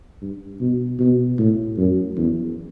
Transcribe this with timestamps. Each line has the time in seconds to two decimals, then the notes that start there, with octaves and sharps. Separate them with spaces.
0.22 G2
0.60 B2
0.99 B2
1.38 A2
1.77 F#2
2.17 E2